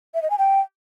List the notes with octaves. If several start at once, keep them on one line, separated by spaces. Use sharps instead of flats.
E5
D#5
G#5
G5